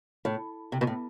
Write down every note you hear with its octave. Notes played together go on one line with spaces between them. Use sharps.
A2
C3
B2
A2